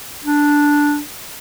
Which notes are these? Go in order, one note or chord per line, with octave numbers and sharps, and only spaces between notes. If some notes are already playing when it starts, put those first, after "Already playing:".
D4